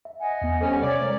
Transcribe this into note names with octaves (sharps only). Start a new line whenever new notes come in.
E5
D#5 F#5 G#5
E2 B3
G3 C#4 A4 C5 C#5
C3 C#5 D5 E5
G#3 A#4